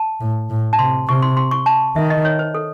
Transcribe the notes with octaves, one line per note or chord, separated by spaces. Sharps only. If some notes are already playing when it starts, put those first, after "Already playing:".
Already playing: A5
A2
A2
A5
C3 C6
C3 C#6
C6
C6
C#6
A5
D#3 E5
D#5
C#5
C5
A4